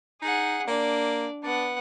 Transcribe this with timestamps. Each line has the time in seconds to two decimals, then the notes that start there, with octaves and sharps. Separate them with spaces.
0.22 D#4 G#4 F#5
0.67 A#3 D4 D5
1.43 B3 D4 F#5